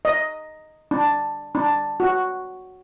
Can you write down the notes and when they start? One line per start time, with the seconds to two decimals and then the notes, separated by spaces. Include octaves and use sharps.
0.05 D#5
0.91 D4
1.55 D4
2.00 F#4